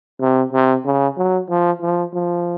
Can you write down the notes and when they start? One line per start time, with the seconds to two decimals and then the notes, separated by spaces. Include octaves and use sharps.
0.20 C3
0.52 C3
0.85 C#3
1.17 F#3
1.49 F3
1.82 F3
2.14 F3